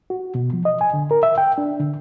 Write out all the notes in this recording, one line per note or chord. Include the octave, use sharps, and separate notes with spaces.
F#4
B2
F3
D#5
G#5
D3
A#4
E5
G5
D4
D3